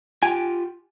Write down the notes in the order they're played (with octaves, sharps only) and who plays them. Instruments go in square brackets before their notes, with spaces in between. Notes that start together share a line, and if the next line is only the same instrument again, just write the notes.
[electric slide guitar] F4 G4 G5 [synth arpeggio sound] G#5